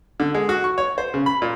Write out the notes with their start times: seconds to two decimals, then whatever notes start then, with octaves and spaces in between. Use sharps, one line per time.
0.20 D3
0.34 G#3
0.49 F#4
0.64 C#6
0.78 C#5
0.98 C5
1.14 C#3
1.26 B5
1.42 A#2